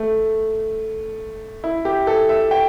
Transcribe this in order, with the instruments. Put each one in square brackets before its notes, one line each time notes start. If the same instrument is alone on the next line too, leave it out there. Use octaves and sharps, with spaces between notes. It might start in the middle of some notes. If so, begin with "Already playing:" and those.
Already playing: [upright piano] A3
E4
G4
A4
E5
G5